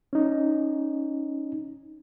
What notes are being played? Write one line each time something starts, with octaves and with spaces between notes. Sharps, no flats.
C#4 D#4